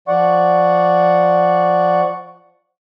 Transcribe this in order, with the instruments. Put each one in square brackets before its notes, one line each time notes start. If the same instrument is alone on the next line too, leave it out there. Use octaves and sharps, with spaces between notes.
[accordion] F3 D5 F#5 C#6